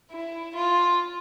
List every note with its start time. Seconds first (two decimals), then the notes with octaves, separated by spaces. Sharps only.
0.11 E4
0.55 F4